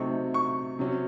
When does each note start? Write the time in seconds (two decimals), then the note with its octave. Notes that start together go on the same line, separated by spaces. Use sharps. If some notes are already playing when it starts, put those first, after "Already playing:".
Already playing: C3 F#3 A3 C4 D#4 C#6
0.34 C#6
0.79 C3 F#3 C#4